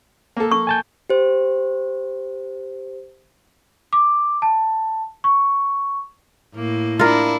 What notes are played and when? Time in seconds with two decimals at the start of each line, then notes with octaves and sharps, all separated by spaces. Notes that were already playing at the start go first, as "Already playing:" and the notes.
0.37 A#3 A4
0.52 C#6
0.67 G#5 A5 G6
1.10 G4 C5
3.93 D6
4.42 A5
5.24 C#6
6.55 A2 A#3
6.99 D4 E4 F4 A#4